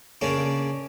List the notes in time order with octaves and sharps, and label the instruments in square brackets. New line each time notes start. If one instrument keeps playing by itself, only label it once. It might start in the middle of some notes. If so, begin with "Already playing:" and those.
[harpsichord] C#3 A#3 C#4 D4